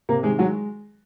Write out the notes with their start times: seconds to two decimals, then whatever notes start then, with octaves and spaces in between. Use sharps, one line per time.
0.09 C3 A#3 A#4
0.23 D#3 G#3 G#4
0.39 F#3 G#3 F#4